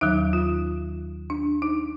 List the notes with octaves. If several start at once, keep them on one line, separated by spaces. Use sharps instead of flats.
D#2 D#3 F#3 D#4
F4
D4
D#4